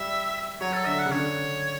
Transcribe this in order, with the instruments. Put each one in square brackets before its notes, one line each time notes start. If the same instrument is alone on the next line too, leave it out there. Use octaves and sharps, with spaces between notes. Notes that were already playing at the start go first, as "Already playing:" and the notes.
Already playing: [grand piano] G3 [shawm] E5
[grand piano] F#3 [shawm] C#5
[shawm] A4
[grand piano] D3 [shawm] E5
[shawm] F#5
[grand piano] C#3
[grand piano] D3 [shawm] C#5